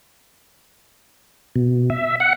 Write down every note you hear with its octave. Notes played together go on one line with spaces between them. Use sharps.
B2
E5
F#5